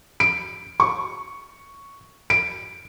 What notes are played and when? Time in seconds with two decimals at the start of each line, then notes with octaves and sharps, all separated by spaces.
0.20 D7
0.80 C#6
2.30 D7